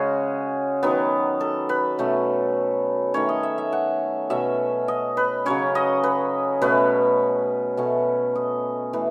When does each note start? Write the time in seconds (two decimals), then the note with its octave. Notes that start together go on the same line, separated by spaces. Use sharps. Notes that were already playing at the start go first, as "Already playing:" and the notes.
Already playing: C#3 G#3 C#4 F#4 G#4
0.83 D#3 F#3 B3
1.41 A4
1.69 B4
1.99 B2 A3 C#4
3.14 D#3 A3 C#4 C#5
3.29 D#5
3.43 E5
3.58 E5
3.73 F#5
4.30 B2 A3 C#4 E5
4.88 D#5
5.17 B4
5.46 C#3 F#3 C#4 C#5
5.75 D#5
6.04 B4
6.62 B2 A3 C#4 B4
7.77 B2 A3 C#4
8.35 D#5
8.93 E3 A3 B4